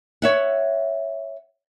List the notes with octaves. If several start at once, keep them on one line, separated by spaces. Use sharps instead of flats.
C#5 E5 F#5